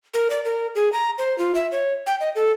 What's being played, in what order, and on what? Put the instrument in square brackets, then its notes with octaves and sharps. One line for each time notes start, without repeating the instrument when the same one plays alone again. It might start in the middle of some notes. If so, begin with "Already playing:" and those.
[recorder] A#4
D5
A#4
G#4
A#5
C5
F4
E5
C#5
G5
D#5
A4